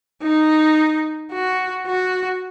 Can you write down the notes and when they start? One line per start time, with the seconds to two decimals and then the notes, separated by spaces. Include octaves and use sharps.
0.22 D#4
1.32 F#4
1.87 F#4